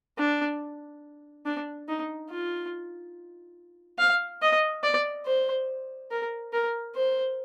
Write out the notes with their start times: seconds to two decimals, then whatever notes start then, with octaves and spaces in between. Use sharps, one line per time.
0.18 D4
1.46 D4
1.88 D#4
2.29 F4
3.99 F5
4.42 D#5
4.84 D5
5.25 C5
6.11 A#4
6.53 A#4
6.95 C5